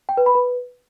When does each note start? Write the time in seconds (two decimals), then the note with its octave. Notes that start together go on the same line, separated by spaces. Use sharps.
0.09 G5
0.17 B4
0.26 B5
0.35 B4